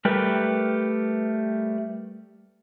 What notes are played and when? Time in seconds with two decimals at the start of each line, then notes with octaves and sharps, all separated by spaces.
0.05 G3 A3 G4 A#4 B4